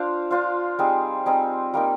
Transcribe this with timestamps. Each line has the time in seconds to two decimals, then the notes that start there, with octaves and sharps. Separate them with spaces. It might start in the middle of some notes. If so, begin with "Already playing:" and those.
Already playing: D4 F4 C5 F5
0.31 D4 F4 C5 F5
0.79 G3 C4 D#4 G#4
1.26 G3 C4 D#4 G#4
1.74 G3 A#3 D#4